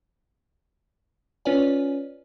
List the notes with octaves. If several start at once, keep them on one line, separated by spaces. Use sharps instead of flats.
C#4 F4 B4 C#5 D5 G#5